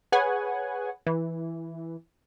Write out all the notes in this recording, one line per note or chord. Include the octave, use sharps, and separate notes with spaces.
G#4 B4 C#5 F#5 G#5
E3